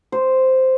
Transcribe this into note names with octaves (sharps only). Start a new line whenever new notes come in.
C5